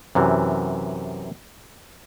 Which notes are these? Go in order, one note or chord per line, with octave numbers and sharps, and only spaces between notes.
F#2 C3 E3